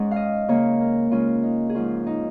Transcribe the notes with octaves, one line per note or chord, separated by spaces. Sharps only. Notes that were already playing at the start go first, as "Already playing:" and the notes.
Already playing: G#2 G#3 C#4
D#5 F5
C#3 A#3 C#4 C#5
A#4
C#3 G#3 C#4 F4
D#4
G#4
G#2 F3 C#4 F4
D#4